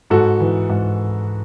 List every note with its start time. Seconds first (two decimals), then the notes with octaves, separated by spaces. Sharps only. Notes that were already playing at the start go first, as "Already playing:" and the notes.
0.10 G#2 F#4 A4
0.40 E3
0.69 G#2